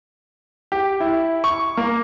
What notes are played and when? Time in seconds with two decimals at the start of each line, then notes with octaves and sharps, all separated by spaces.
0.72 G4
1.00 E4
1.44 C#6
1.77 A#3